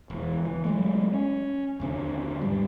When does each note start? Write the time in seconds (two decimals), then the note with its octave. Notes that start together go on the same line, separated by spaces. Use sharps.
0.10 E1 E3
0.45 E3
0.64 F#3 G#3 A3
1.13 C#4
1.80 D#2 D3 C4
2.41 G#2 G3